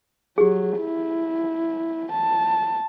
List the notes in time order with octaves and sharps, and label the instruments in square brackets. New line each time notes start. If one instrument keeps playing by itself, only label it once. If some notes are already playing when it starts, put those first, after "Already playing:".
[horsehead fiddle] F#3 [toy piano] G4 G#4
[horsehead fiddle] E4
A5